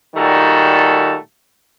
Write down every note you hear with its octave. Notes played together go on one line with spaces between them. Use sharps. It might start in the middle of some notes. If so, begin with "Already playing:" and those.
A#2 D#3 G3 A3 F#4 A4